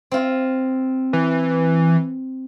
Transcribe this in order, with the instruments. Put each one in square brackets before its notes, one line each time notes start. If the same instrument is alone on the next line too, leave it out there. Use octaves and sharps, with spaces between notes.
[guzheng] C4 F4
[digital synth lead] E3